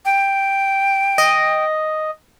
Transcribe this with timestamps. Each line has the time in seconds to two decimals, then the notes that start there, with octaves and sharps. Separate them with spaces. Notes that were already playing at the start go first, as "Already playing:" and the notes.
0.05 G5
1.18 D#5